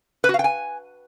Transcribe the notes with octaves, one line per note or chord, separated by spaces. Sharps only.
B4
F#4
F5
G5
G#5